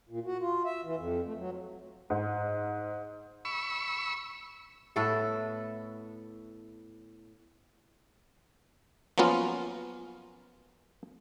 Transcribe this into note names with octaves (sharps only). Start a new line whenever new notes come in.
A#2
F#4
F4
E5
E3
F2
A3
F#3
G#2
B5 C#6 E6
A2 B3 A4 E5
F3 F#3 A#3 B3 C#4 F4